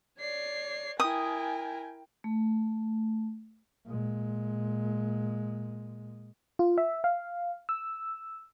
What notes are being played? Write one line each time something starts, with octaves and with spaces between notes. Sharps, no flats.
C#5 D5 C7
E4 A#4 G5 G#5 D#6
A3
A#2 G#3
F4
E5
F5
E6